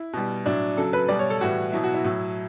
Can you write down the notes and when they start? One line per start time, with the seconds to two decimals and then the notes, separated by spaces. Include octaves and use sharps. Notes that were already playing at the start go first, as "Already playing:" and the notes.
Already playing: E4
0.13 B2 G3
0.46 A2 F#3 D4
0.77 C#3 F#3 A4
0.93 B4
1.09 B2 G3 D5
1.19 C#5
1.30 A4
1.41 A2 E3 G3 F#4
1.72 B2 F#3 E4
1.84 F#4
1.94 E4
2.04 A2 F#3